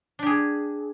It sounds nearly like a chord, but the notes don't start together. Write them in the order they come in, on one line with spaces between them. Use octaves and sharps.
D4 G4 G#4